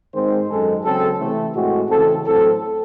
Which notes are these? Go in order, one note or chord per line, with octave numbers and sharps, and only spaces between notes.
G#2 D#3 G#3 C4 C5
F#2 D#3 G#3 A4
C#3 F#3 C4 A4
C3 E3 A3 C4
A2 G#3 C4 F#4
C#3 E3 C4 A4
A2 F#3 C4 A4